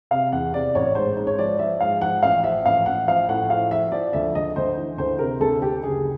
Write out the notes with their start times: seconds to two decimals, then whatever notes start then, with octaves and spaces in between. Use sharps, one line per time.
0.11 C3 F5
0.32 E2 F#5
0.53 C3 D5
0.75 A1 C#5
0.95 G#2 C5
1.17 G#2
1.27 C#5
1.39 F3 D5
1.59 F3 E5
1.81 G#2 F5
2.01 F3 F#5
2.23 A1 F5
2.43 F3 E5
2.66 A1 F5
2.86 A1 F#5
3.08 F3 F5
3.29 A2 F#5
3.50 F3 F5
3.71 F3 E5
3.92 F3 D5
4.13 D2 E5
4.35 D2 D#5
4.56 D2 C5
4.77 E3
4.98 D2 C5
5.19 C3 A#4
5.40 D2 A4
5.62 D2 G4
5.83 F#1 G#4